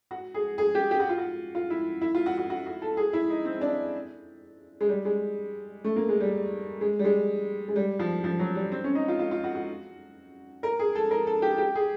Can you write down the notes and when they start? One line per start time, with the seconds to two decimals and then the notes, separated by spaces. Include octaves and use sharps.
0.11 F#4
0.34 G#4
0.58 G#4
0.75 G4
0.91 G4
1.00 F#4
1.09 F4
1.18 F#4
1.55 F4
1.70 E4
2.01 E4
2.15 F4
2.26 F#4
2.38 F#4
2.50 F#4
2.66 F#4
2.82 A4
2.97 G#4
3.13 E4
3.30 D#4
3.45 C4
3.61 D4
4.81 G#3
4.89 G3
5.05 G#3
5.84 A3
5.96 A#3
6.09 G#3
6.20 G3
6.81 G#3
6.99 G3
7.05 G#3
7.68 G#3
7.76 G3
7.99 F3
8.24 F3
8.39 F#3
8.56 G3
8.72 C4
8.84 C#4
8.95 D#4
9.08 F4
9.19 F4
9.31 F4
9.44 F#4
9.55 F#4
10.63 A#4
10.79 G#4
10.95 A4
11.11 A#4
11.27 A4
11.42 G4
11.58 G4
11.75 G#4